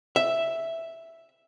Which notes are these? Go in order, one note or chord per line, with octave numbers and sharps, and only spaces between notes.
E5